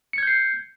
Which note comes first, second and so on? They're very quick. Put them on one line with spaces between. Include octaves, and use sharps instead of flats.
C#7 G#6 G6 C7